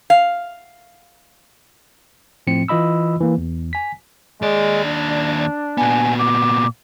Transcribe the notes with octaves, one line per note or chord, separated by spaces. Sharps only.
F5
A2 F3 C4 C#7
E3 F4 D#5 B5 E6
E3 A#3
E2
G#5 B6
D#2 G#3 D5
D4
A#2 B3 G#5
D6